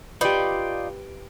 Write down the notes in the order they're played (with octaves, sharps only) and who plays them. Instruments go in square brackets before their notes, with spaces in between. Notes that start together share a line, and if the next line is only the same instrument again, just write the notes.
[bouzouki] D#4 F4 D5 [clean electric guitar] G4 B4